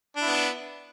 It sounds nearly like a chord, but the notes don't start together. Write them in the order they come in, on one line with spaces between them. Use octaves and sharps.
D4 E4 B3